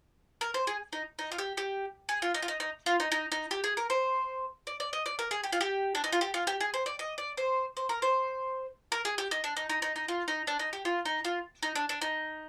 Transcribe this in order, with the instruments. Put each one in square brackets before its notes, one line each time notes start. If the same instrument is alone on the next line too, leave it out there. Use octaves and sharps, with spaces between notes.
[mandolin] A#4
C5
G#4
D#4
D#4
F4
G4
G4
G#4
F4
D#4
F4
D#4
D#4
F4
D#4
D#4
D#4
G4
G#4
A#4
C5
D5
D5
D#5
D5
A#4
G#4
G4
F4
G4
D4
D#4
F4
G4
F4
G4
G#4
C5
D5
D#5
D5
C5
C5
A#4
C5
A#4
G#4
G4
D#4
D4
D#4
D#4
D#4
D#4
F4
D#4
D4
D#4
G4
F4
D#4
F4
D#4
D4
D4
D#4